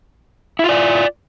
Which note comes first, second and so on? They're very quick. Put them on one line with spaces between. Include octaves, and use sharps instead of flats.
E4 F4 D5